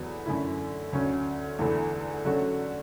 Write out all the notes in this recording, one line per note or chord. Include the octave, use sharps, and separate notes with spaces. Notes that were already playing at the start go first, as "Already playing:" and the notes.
Already playing: E2 D3 F#3 B3
F#2 D3 A3 E4
D2 D3 F#3 C#4
E2 D3 A3 E4
D3 F#3 A3 C#4 F#4